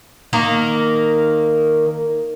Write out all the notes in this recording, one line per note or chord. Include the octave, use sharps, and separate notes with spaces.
D#3 A#3 A#4